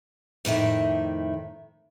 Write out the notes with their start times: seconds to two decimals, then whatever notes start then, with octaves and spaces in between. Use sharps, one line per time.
0.45 F2 A2 D#3 E5